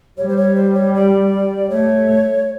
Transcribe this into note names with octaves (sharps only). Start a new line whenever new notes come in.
G3 C#5
C5
C#5
C5
C#5
D5
A3 C#5